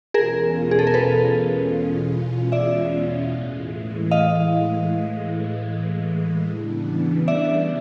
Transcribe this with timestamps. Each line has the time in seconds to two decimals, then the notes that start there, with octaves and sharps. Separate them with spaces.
0.14 E2 B2 G#3 C#4 F4 G#4 A#4
0.71 G#4
0.79 A4
0.87 A#4
0.94 A4 B4
2.52 D5 E5
3.32 A2 E3 G#3
4.11 D#5 F5
6.48 C#3 E3 G3 B3 D4
7.28 D5 E5